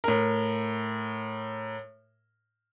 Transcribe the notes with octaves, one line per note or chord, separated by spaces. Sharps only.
A2 A#4